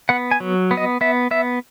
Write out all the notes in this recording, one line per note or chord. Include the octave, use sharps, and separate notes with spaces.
B3 F#5
G#5
F#3
B3
D#5
B3 E5
B3 E5